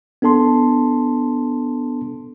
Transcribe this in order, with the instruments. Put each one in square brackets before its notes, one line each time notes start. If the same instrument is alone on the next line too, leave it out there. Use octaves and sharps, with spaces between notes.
[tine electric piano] B3 D4 A4 A5 C6